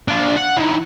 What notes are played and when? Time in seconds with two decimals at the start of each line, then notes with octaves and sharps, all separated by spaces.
0.08 D4 F4
0.36 F#5
0.57 D#3 E3